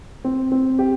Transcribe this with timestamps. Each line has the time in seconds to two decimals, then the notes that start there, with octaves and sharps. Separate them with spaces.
0.25 C4
0.52 C4
0.79 G4